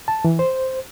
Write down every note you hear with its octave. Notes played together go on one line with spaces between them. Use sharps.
A5
E3
C5